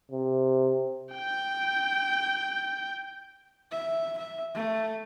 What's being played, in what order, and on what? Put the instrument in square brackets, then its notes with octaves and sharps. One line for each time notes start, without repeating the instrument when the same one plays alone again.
[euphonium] C3
[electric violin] G5 G6
[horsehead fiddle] E5
E5
A3